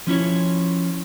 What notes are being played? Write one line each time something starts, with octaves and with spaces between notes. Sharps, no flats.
F3 C#4 E4 C#5